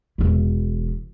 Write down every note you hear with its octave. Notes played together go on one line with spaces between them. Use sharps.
E1 E3